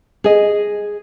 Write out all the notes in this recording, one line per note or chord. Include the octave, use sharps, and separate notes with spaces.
G#4 D#5